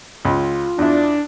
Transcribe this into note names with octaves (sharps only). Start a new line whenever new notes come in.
C#2 F4
E2 D4 E4